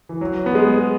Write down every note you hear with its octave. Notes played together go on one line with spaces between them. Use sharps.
E3
F#3
B3
G#3